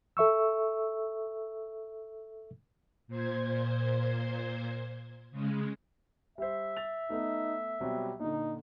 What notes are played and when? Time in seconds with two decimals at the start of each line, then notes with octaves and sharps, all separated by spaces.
0.17 A4 E5 C#6 E6
3.08 A#2 C5 G#6
5.31 C#3 G#3
6.38 G3 C5 E5
6.77 A6 F7
7.10 A3 B3 D#4
7.81 B2 F#3 G3 C4
8.20 A#2 D3 D#4